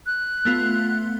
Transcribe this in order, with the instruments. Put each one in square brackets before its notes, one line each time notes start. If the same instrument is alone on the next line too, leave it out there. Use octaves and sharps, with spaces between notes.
[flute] F#6
[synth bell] A3 B3 F4